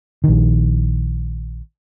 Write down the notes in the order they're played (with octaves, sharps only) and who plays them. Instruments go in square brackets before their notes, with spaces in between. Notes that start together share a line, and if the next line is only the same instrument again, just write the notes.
[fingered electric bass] A#1 D#3